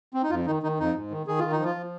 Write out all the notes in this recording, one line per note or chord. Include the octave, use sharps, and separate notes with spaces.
C4
D#4
F2 F4
D#3 D#4
D#3 D#4
F2 D#4
G#2
D#3
D#3 G#4
D#3 F4
D#4
F3
F4
F3